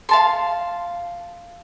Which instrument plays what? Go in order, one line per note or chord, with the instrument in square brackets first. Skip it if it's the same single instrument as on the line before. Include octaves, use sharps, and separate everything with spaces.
[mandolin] F5 A5 C6